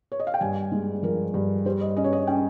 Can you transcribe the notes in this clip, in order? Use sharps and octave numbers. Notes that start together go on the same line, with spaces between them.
C#5
D#5
F5
G5
G2 G#5
G#3
F3 A#4
G2
G3 C5
D#5
C#4 D#5
C#5
D#5
C#4 G5